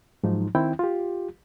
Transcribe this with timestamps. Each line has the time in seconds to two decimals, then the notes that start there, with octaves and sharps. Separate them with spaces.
0.23 G#2 F3 F#3 D#4
0.55 D#3 C4 E4 G5
0.79 F4 G4